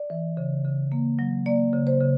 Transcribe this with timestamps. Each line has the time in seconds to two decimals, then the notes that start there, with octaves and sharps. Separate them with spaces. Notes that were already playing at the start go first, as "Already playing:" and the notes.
Already playing: D5
0.10 E3
0.37 C#3
0.64 C#3
0.92 A#3
1.19 F#3
1.46 A#3 D5
1.73 C#3
1.87 C5
2.00 C#3